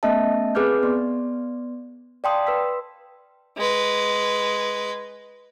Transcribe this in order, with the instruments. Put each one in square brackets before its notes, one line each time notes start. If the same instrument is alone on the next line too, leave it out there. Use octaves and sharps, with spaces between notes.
[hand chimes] A3 B3 C#4 D#5 E5 A5
C4 G#4 B4 D6 F6 G6
B3 D5 C6
D5 F5 G5 A5 C6 D#6
B4 C6 E6 B6
[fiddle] G#3 B4